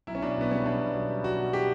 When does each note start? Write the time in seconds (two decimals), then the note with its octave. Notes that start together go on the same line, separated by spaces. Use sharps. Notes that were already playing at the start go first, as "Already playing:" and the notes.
0.07 B1 E4
0.15 C#4
0.22 B2 D4
0.37 B1 B3
0.51 G3 C#4
0.65 B1 D4
0.81 B2
0.94 B1
1.09 G3
1.24 B1 F#4
1.38 B2
1.53 G4